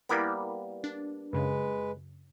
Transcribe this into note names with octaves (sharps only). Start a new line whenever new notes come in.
G3 A#3 B3 E4 A#4 B5
D4
F#2 C#3 G#3 B4